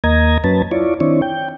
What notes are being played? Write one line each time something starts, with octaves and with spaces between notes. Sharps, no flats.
D#2 A#3 D#5 A#5 G#6
F#2 F#3 C#4 B4 A5
E4 F4 C#5 D5
D#3 C4 D4 E4 C#5
G5